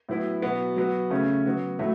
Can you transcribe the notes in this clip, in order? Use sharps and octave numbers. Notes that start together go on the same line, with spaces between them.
A2 F#3 B3 E4
B2 F#3 B3 F#4
F#3 B3 F#4
C#3 A3 C#4
F#3 B3 F#4
A2 F#3 A3